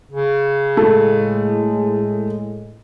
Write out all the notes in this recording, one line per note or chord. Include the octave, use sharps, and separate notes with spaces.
C#3
A2 G#3 A3